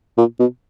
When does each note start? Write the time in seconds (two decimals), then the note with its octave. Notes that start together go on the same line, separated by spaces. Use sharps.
0.18 A#2
0.40 B2